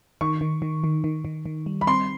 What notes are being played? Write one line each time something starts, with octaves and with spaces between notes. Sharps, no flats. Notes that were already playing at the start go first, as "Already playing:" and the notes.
D#3 C#6
D#3
D#3
D#3
D#3
D#3
D#3
G3
B5
C4 C6